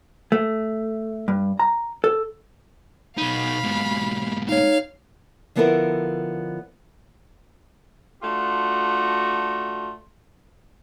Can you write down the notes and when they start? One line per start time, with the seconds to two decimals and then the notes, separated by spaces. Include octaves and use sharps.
0.32 A3
1.28 G2
1.59 A#5
2.04 A4
3.18 B2 D#4 F5 B5
3.64 G#2 B2
4.49 D#4 C#5 F5
5.55 D3 F3 B3 E4 A4 A#4
8.23 A3 D4 F4 F#4